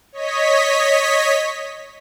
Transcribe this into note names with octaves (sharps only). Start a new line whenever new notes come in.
C#5 D#5 B6